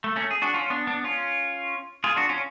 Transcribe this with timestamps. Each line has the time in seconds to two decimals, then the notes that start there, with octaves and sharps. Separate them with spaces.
0.04 A3
0.16 A3 C#4
0.31 G#4
0.42 D4 F#4
0.54 C#4 F4
0.70 B3 D4
0.87 B3 D4
1.04 C#4 F4
2.04 F4 G#4
2.16 D4 F#4
2.29 C#4 F4